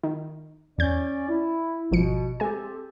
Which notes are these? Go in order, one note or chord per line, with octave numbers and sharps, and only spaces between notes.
D#3
E2 C#4 D5 G6
E4
G#1 B2 F3 C#7
G#3 C4 G4 A4 G#5